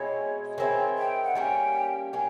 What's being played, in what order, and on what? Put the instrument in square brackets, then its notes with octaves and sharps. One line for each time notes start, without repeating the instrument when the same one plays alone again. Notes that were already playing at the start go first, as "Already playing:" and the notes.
Already playing: [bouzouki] B2 G#3 C4 E4 [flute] C#5
[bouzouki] D#3 G#3 C4 E4 [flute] C#5
[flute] G5
F#5
[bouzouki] G3 A#3 C#4 [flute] G5
[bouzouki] F#3 A#3 C#4 [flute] G5